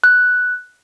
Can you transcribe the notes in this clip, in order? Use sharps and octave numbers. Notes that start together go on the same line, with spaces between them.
F#6